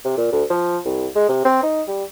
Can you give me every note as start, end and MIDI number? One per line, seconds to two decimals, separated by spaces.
0.04 0.17 48
0.17 0.29 46
0.32 0.43 38
0.50 0.78 53
0.85 1.07 36
1.15 1.28 56
1.29 1.43 48
1.45 1.60 60
1.63 1.82 63
1.87 2.04 55